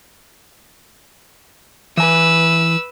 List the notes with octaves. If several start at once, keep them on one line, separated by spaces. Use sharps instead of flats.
E3 B4 G#5 E6